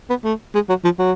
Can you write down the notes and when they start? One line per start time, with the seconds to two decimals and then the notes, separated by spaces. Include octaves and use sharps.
0.09 B3
0.24 A3
0.54 G#3
0.69 F#3
0.84 F3
0.99 F#3